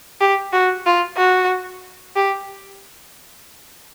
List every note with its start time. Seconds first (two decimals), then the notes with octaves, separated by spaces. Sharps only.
0.21 G4
0.53 F#4
0.86 F4
1.18 F#4
2.16 G4